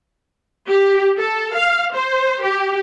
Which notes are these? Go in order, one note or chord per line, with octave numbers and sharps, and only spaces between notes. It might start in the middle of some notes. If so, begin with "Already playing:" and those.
G4
A4
F5
C5
G4